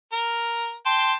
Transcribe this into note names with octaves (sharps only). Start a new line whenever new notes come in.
A#4
G5 A5 C6